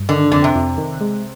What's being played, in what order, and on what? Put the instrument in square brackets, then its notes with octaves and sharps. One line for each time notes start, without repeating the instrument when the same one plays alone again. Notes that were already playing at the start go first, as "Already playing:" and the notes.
Already playing: [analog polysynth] G2
[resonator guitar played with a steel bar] D3 [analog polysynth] D#3
[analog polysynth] F2 [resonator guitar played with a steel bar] D3
[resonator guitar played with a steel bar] C3
[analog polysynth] F2
D#3
G#3